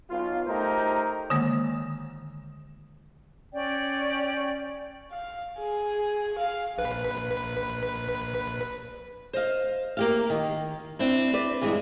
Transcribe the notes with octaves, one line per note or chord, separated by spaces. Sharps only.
B1 F4
A3 D#4 G4 A#4 C5
D3 D#3 G#3 A#3
C#4 D5 G5
F5
G#4
F5
A#1 B4
C5 D#5 F5
A#3 G4 F5
D#3
C4 D4 E4
B4 D5
G2 E3 G3 G#3